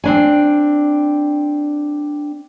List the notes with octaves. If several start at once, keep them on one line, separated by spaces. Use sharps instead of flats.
C4 D4 G#5